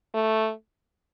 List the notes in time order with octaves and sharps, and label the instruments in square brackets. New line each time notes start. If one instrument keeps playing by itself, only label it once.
[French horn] A3